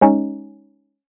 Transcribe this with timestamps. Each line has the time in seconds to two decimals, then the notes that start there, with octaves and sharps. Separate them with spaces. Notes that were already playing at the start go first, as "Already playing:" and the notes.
0.01 G#3 C#4 D#4